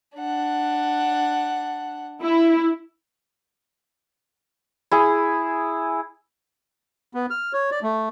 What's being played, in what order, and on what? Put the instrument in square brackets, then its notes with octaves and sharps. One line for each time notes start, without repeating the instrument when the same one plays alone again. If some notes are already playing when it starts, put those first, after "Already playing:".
[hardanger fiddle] D4 F#5
[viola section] E4
[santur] E4 G#4
[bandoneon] B3
F6
C#5
D5
A3